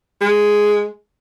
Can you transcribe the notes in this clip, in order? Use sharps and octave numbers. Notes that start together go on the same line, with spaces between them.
G#3